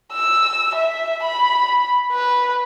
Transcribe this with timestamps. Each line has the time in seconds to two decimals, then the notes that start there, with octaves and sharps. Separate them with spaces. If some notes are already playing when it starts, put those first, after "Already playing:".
0.13 E6
0.75 E5
1.23 B5
2.12 B4